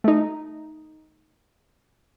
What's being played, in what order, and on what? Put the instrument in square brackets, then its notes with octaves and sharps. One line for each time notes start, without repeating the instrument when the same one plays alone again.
[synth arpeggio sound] A3 D#4